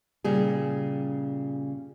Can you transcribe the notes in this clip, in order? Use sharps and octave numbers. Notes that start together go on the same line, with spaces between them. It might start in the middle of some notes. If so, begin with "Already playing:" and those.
A#2 C#3 G3 G#4